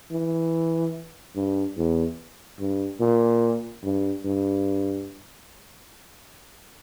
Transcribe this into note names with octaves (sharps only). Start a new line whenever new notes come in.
E3
G2
E2
G2
A#2
G2
G2